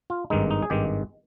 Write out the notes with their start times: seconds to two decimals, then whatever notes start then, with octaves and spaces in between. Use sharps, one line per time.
0.10 F4
0.30 G#1 G2 D#3 G#3 D#4
0.51 D#4
0.62 G#4
0.70 G#1 G2 D#3 G#3 G4